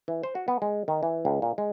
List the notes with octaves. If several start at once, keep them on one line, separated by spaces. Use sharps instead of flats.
E3
C5
F#4
B3
G#3
D#3
E3
C#2
A#2
G#3